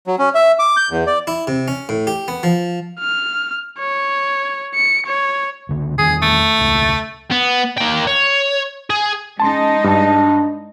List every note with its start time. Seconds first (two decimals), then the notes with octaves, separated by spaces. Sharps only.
0.07 F#3
0.19 C#4
0.35 E5
0.59 D6
0.77 G6
0.90 E2
1.07 D5
1.27 E4
1.47 C3
1.68 C#4
1.89 A2
2.07 G4
2.28 B3
2.43 F3
3.00 F6
3.79 C#5
4.75 C#7
5.07 C#5
5.69 C#2 D3
5.98 E1 D#3 G#4
6.22 A3
6.58 E1 C#2
7.31 B3
7.78 A#3 G5
8.07 C#5
8.90 G#4
9.40 G#3 C#4 D#4 A5 C6
9.84 G2 D4 A5